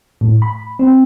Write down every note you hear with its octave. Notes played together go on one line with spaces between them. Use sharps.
A2
B5
C4